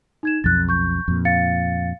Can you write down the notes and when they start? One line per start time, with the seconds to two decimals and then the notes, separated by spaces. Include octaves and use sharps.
0.23 D#4 G#6 E7
0.44 B1 F2 F#6 A6
0.69 C#6 G6
1.08 F2 A#2
1.25 F5 A6 C#7